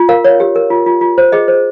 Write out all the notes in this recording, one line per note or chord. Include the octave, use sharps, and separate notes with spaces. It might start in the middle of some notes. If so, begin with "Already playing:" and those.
Already playing: F4
A#4 F5
C#5
G4
A#4
F4
F4
F4
C5
G#4 D#5
C5